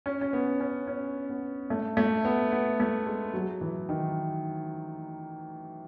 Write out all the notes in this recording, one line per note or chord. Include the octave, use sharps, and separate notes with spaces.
C#4
C#4
B3
C#4
C#4
B3
A3
A3
B3
B3
A3
G#3
F#3
E3
D#3